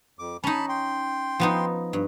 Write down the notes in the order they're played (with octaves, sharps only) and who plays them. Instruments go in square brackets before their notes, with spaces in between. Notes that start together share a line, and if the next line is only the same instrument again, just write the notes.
[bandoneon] F2 D6
[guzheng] C#4 D#4 [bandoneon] A5 B5
[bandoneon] G5 C6
[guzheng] F3 B3 D#4
G2